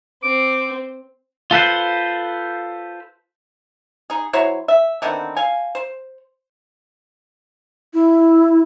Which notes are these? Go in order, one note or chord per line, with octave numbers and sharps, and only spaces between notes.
C4 D6
F4 A4 B4 C5
D#4 G#4
F#3 E4 C5 C#5
E5
D3 D#3 B3 C4
F5 G#5
C5
E4